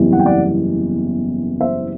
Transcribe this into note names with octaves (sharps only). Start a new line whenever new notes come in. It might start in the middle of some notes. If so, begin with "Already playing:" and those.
Already playing: F#1 E2 C3 E3 G3
F#5
G5
D5 F#5
C5 E5